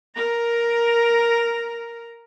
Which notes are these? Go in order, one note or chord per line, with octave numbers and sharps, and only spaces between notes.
A#4 A#5